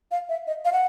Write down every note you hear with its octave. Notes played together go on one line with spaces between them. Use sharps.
F5
E5
D#5
F5
F#5